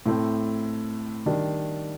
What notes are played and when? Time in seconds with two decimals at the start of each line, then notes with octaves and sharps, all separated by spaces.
0.06 A2 A3 C4
1.26 D#3 G3 D4